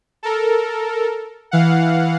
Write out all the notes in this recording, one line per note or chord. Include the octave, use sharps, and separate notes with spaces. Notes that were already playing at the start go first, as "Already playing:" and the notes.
A4 A#4
E3 F5 F#5